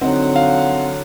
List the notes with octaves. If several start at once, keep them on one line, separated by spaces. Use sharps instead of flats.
D3 F#3 C4 D#4 F#5
F5